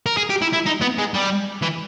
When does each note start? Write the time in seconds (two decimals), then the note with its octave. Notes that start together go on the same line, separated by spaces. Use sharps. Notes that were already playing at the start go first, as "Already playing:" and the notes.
0.06 A#4
0.17 G#4
0.30 G4
0.42 E4
0.53 E4
0.66 D#4
0.81 B3
0.99 G#3
1.14 G3
1.62 E3